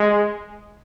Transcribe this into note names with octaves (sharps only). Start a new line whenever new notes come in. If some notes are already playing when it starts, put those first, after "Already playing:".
Already playing: G#3